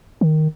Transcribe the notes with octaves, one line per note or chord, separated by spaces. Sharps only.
D#3